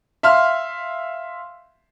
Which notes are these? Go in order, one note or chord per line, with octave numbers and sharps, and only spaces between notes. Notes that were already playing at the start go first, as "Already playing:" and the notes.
E5 F5 C6 F6